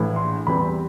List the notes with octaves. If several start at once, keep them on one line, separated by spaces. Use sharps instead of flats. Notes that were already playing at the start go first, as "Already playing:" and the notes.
Already playing: A#1 A2 E3
C6
E2 C3 E3 G3 C4 B5